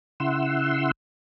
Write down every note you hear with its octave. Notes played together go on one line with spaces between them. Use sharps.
C#3 E4 F#5 C6 E6